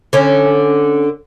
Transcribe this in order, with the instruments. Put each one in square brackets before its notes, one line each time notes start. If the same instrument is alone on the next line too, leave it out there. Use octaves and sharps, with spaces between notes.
[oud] D3 C#4